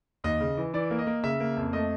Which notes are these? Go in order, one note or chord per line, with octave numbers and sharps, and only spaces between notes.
D#2 D#5
C#3
E3
E3 D5
A#3
D#5
A#3
C#3 E5
A#3
F2
A3 D#5